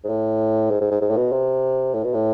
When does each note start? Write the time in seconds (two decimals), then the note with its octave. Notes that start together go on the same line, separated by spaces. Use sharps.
0.04 G#2
0.09 A2
0.70 G#2
0.81 G#2
0.91 G#2
1.01 G#2
1.10 A2
1.17 B2
1.32 C3
1.94 A2
2.04 B2
2.14 A2